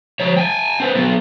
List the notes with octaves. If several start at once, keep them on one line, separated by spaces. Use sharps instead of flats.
F3 C#5
G5 G#5
C4 B4
F#3 B3